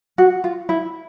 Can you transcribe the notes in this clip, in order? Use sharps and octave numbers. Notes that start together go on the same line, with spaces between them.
F#4
F4
E4